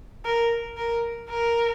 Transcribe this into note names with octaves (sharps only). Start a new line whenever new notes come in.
A#4
A#4
A#4